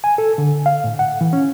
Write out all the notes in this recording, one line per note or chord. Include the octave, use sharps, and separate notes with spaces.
G#5
A4
D3
F5
A2
F#5
E3
C#4